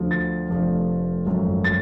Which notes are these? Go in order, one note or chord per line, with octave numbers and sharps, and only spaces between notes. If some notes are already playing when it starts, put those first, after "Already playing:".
Already playing: D2 D3 F3
A6
F1 F2 F3 A3 D4
G#1 F#2 F3 A3
A6